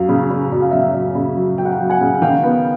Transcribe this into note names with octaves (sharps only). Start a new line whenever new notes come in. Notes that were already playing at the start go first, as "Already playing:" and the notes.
Already playing: F#2 F#3 F5
C#3
C#3
F#2
F5
F#2 E5
F5
F#2
C#3
F#3
F#3 G5
F#5
F5 G5
F#3
F#5 G#5
C#3
D#3 F5 G5
B3